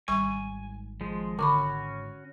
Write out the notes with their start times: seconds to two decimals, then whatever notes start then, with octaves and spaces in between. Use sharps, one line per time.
0.08 G#1 G3 G#5 C#6
1.01 F3 G#3
1.39 D3 C#4 F#4 B5 C#6 D6